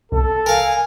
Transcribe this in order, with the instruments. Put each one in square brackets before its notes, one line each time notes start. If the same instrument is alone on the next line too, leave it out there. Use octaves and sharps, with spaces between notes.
[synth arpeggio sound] C2 [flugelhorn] A4
[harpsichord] A#4 F5 [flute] G#5